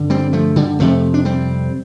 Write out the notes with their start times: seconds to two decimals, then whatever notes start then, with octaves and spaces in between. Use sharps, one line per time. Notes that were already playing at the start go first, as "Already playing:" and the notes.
Already playing: G2 D3
0.10 G3 C4
0.33 F3 A3
0.56 D3 G3
0.80 F2 C3 F3 A3
1.14 D4
1.25 G3 C4